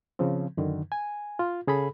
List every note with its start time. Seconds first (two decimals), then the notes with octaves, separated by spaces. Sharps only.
0.19 C#3 F3 C4
0.57 F#2 D3 D#3
0.92 G#5
1.39 F4
1.67 C#3 G#4 A4 B5